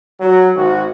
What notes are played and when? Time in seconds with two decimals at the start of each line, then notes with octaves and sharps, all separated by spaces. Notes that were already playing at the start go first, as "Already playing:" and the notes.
0.20 F#3
0.55 G#1 F#4